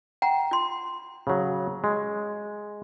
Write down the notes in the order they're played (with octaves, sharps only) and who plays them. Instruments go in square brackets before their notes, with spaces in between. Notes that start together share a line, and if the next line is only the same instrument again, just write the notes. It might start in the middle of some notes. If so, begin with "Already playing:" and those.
[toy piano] F#5 G5 A#5
F4 C6
[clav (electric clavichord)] C#3 F#3
G#3